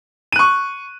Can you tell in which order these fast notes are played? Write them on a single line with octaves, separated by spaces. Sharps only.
D#7 F#6 C#6